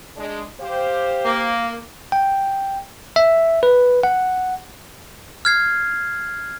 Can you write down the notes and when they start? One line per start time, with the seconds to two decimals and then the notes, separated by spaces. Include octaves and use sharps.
0.17 G#3 D4
0.61 G4 C5 F5
1.25 A#3
2.12 G5
3.16 E5
3.63 B4
4.03 F#5
5.45 F6 G#6 C7